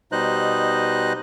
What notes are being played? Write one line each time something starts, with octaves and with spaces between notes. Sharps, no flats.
B2 G3 D#4 C5 D#5 F#6